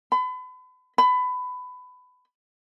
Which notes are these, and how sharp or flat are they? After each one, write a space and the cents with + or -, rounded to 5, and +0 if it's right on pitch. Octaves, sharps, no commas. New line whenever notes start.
B5 +35
B5 +20